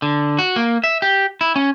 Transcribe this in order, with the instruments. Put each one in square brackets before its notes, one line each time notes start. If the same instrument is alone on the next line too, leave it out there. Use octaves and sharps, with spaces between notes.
[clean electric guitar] D3
F#4
A#3
E5
G4
E4
C#4